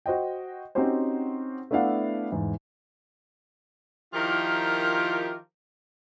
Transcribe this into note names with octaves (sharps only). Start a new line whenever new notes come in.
F#4 C5 D#5 G5
C4 C#4 D#4 F#4 G4 C5
A3 B3 D4 E4 F5 F#5
E2 G#2
D#3 F3 E4 F4 G4 A#4